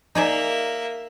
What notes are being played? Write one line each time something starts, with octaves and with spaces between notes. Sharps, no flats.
A#3 D#4 G#4 D5 E5